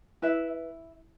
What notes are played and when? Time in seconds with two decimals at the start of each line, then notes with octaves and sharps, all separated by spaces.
0.22 E4 B4 E5